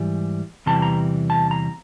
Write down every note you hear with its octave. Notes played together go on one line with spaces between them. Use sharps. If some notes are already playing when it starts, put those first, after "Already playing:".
Already playing: G#2 E3 G3
E2 C3 E3 G3 A5
A#5
A5
A#5